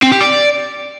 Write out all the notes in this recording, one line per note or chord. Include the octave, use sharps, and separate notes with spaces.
C4
G4
D5